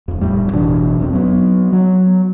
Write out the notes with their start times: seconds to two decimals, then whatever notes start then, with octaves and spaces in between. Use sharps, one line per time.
0.08 D1 F2
0.21 D1 F2 A2 G3
0.52 G1 B2 E3 D4
1.00 D1 F2 F#3 C4
1.13 F#3 B3
1.72 F#3